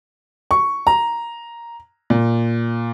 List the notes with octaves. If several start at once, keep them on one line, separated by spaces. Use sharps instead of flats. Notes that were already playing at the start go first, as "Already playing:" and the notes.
C#6
A#5
A#2